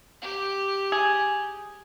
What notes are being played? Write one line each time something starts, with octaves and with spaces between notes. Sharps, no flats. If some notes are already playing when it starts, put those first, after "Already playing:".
G4
G#4